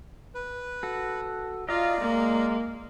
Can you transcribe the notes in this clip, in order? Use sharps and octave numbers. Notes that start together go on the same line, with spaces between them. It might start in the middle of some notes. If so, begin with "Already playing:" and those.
B4
F#4 A4
F4 D5 D#5 F5 A#5
G#3 A#3